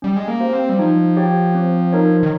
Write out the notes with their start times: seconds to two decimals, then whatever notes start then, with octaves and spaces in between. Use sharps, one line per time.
0.02 G3 C#4
0.16 G#3
0.28 A#3
0.41 G4 C5 F5
0.53 C4
0.69 G3
0.79 F3 D#4
1.17 G4 C#5 G5
1.55 C4
1.93 D#4 A#4 C#5
2.23 D#3